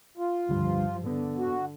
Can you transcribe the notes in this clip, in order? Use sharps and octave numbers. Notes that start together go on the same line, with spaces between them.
F4
C#2 G2 D3 F3 G3
D3 B3
F#4